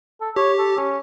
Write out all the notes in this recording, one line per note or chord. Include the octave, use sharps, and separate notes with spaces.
A4
G4 C#5
A4
C#4